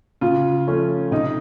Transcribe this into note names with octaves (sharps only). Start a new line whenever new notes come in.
C#3 F4
F3 A3 C#4
C3 D#4